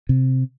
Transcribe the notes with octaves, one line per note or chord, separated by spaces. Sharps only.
C3